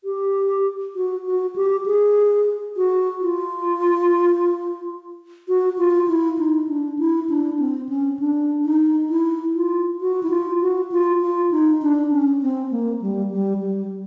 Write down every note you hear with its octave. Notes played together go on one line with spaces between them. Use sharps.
G4
F#4
F#4
G4
G#4
F#4
F4
F#4
F4
E4
D#4
D4
E4
D4
C4
C#4
D4
D#4
E4
F4
F#4
E4
F4
F#4
F4
F4
D#4
D4
C#4
C4
A#3
G3
G3
G3